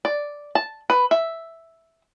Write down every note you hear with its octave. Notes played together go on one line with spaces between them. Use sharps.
D5
A5
B4
E5